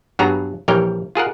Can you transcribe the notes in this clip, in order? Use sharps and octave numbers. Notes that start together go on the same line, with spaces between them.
G2 F#3 B3 F#4 G#4 A#5
A#1 E3 G3 A#4 C#5 G5
F4 G#4 A#4 F#5